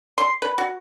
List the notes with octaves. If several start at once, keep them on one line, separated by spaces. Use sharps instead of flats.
C6
B4
F#4